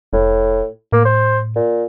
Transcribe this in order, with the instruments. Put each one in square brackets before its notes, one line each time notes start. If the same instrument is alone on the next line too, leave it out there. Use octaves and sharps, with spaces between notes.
[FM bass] F1 [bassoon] A2
[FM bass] A2 [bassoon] A#3
[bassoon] C5
A#2